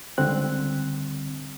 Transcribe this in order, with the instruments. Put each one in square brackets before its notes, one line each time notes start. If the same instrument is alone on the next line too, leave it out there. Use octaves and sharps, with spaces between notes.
[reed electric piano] C#2 D3 G3 C4 F#6